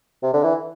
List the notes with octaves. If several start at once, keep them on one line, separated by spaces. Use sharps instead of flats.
C3
D3
E3